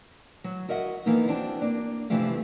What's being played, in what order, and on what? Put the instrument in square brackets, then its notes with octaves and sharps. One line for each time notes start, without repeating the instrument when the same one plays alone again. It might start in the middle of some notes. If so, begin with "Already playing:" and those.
[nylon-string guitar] F#3
F#4 A#4 D#5 E5 F#5
E3 F3 A#3 B3 D#4
C4 D4 F#4 A5
A#3 D4
G2 C3 E3 F3 G3 A3